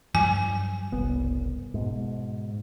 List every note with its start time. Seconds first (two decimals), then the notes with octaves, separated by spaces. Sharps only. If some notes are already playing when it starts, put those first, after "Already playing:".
0.15 G2 F3 F#3 G#5
0.92 F#1 C2 B3
1.74 G#2 B2